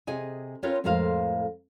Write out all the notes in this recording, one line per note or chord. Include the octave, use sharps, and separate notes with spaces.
C3 G#4 D#5 G#5
C4 C#4 F4 A#4 B4 C#5
F2 A2 G#3 A#4 C5 F5